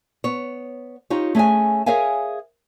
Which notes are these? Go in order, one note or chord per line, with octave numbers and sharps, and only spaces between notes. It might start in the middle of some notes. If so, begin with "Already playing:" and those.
B3 C#5
D#4 F4 G4 C#5
A3 C#4 G#4 C#5 G#5
G#4 A#4 C#5 E5 F5 G#5